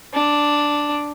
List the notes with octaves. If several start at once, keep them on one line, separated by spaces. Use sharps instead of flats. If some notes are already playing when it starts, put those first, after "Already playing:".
D4